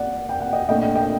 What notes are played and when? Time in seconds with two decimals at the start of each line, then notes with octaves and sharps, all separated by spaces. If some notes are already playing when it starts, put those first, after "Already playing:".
Already playing: D5 F#5
0.29 G5
0.41 F#5
0.53 D#5 G5
0.69 A#2 A3 D4 D#5 G5
0.82 D#5 G5
0.95 D#5 G5